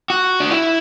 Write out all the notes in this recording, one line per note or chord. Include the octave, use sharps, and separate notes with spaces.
F#4
D4
E4